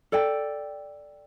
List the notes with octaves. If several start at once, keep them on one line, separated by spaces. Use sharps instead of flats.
A4 D5 G5